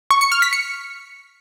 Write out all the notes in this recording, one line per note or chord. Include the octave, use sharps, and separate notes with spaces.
C#6
C#7
F6
B6
C#7